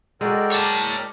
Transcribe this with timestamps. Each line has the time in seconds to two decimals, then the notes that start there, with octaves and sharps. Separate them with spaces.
0.21 G#3 F#4 A4 A#4 D5 F#5 G5 E6
0.52 C#5 A5 D6